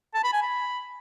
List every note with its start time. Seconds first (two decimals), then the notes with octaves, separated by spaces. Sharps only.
0.14 A5
0.24 B5
0.33 G#5
0.42 B5